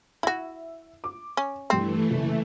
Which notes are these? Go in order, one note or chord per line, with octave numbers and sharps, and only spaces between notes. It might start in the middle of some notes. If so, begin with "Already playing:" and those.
E4 F#4 E5
D6
C#4
G2 E3 A3 C4 C7
F#1